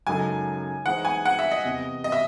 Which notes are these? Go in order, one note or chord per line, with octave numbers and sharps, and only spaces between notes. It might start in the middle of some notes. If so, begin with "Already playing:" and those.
F#2 C#3 G#3 D#4 A4 G#5
E3 G#3 D#4 G#4 C5 F#5
G#5
F#5
E5
D#5
E2 C3 E3
D#5
E5